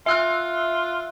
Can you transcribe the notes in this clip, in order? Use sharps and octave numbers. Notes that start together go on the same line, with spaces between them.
F4 E5 E6 F#6